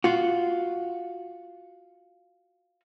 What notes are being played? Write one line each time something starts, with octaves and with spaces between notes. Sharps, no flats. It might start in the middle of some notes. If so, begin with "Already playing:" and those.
F4 F#4